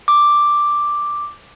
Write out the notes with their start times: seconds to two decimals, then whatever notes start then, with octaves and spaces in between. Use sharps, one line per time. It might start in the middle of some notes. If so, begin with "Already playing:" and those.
0.08 D6